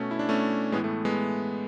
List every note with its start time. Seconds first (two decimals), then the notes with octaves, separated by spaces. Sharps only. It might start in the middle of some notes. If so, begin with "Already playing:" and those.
Already playing: B2 A3 C#4
0.11 E4
0.19 D4
0.29 B2 A3 C#4
0.72 A2 G#3 B3
0.76 E3
0.84 A3
1.05 G#3 B3